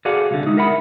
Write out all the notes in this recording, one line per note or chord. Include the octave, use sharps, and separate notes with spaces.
F#4 G#4 A4 D5 F5 F#5
C2 D3
G#3 D#4 E4
A#4 E5 F#5 B5